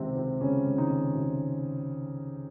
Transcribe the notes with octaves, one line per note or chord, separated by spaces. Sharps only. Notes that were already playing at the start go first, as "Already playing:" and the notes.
Already playing: C#2 C3 D#3 C4
C3
C#2 C#3 C#4
C#2
D#3 D#4
D#3
C3